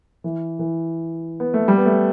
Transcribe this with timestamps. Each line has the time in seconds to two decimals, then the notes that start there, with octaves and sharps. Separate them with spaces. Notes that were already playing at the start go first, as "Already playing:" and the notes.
0.24 E3
0.59 E3
1.40 B3
1.54 A3
1.68 G3
1.78 B3
1.85 A3